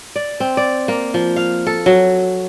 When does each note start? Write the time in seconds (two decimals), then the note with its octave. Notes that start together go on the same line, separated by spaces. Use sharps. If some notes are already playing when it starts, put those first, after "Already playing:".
0.16 D5
0.40 C4
0.57 D5
0.88 A#3
1.14 F3
1.36 F5
1.67 A4
1.86 F#3